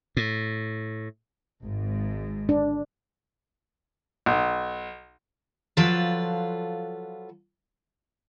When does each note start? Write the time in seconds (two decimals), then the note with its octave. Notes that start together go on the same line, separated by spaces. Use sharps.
0.17 A2
1.64 G#1 G#2
2.49 D4
4.26 B1
5.77 F3 F#3 F4 A4 B4